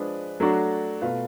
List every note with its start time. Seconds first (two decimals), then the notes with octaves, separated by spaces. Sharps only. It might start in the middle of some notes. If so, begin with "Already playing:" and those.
Already playing: F3 G#3 D4 G#4 B4
0.40 F#3 A3 D4 F#4
1.01 B2 A3 F4 B4 F5